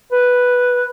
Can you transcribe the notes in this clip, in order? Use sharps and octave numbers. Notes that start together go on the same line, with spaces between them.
B4